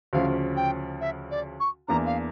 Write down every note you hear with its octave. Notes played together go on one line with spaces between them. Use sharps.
D2 C#3 F3 C#4 F5
G5
E5
D5
C#6
E2 E3 A#3 D4 A#5
F5